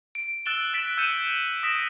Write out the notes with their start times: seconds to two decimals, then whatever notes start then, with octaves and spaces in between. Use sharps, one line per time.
0.15 D7
0.46 E6 F#6 A6 D7 E7 G7
0.73 F#6 A6 B6 D7 E7 F#7
0.98 E6 G6 C#7 D#7 E7
1.63 D#6 A#6 B6 D7 E7